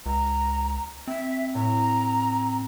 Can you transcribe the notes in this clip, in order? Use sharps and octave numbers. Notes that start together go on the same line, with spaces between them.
C#2 A#5
C4 E5
A2 A#5